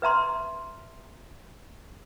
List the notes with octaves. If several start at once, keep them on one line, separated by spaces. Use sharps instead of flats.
B4 E5 A#5 C6